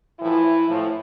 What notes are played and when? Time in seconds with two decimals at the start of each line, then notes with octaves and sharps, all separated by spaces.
0.20 A2 E3 F3 E4
0.68 A2 F3